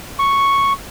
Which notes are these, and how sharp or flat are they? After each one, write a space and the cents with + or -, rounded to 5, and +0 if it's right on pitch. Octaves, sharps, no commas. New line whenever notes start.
C#6 +0